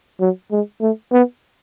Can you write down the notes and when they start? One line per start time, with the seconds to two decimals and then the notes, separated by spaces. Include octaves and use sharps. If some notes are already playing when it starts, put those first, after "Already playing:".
0.21 F#3
0.51 G#3
0.81 A3
1.12 B3